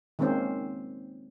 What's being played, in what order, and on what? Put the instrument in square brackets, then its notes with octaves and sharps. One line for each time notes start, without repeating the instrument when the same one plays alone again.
[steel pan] D#3 G#3 A#3 C4 C#4 C5